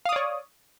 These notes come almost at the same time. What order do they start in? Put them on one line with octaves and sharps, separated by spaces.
F5 D#6 D5 C#5